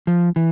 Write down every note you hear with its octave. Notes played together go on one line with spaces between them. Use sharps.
F3
E3